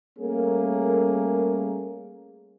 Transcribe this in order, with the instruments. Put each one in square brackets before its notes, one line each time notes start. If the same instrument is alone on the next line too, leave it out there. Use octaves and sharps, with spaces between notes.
[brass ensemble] G3 A3 A#3 C#4 G#4 A#4